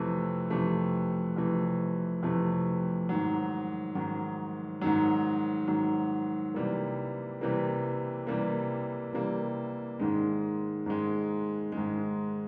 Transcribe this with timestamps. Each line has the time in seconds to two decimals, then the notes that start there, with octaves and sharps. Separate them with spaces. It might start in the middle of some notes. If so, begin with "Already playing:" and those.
Already playing: F2 C3 E3 A3
0.50 F2 C3 E3 A3
1.36 F2 C3 E3 A3
2.23 F2 C3 E3 A3
3.09 G#2 D#3 F#3
3.95 G#2 D#3 F#3
4.81 G#2 D#3 F#3
5.67 G#2 D#3 F#3
6.54 C3 E3 G3 A#3
7.41 C3 E3 G3 A#3
8.27 C3 E3 G3 A#3
9.13 C3 E3 G3 A#3
10.00 G#2 D#3 G#3
10.86 G#2 D#3 G#3
11.72 G#2 D#3 G#3